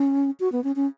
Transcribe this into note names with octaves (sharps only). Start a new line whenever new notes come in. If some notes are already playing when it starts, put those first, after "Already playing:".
Already playing: C#4
F#4
B3
C#4
C#4